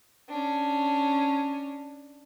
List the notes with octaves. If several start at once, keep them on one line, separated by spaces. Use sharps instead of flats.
C#4 D4